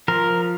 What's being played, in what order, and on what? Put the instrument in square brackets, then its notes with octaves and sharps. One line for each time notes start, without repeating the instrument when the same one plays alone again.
[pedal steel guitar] F3 A#4